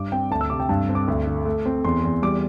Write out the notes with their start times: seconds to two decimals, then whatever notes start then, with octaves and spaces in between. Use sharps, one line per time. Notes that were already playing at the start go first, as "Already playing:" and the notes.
Already playing: G2 D6
0.12 C4 G5
0.31 D2 A5
0.41 E6
0.50 C3 D6
0.60 G5
0.69 G2 A5
0.89 C4
0.95 D6
1.08 D2
1.27 D3
1.45 A3
1.65 C4
1.85 E2 C6
2.03 E2
2.22 G3 D6